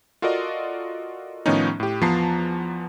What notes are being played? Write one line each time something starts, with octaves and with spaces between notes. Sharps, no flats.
F4 F#4 A4 A#4 D5 D#5
A2 D#3 F3 B3 C#4 D#4
A2 G4
E2 F3 B3 A5 A#5 C7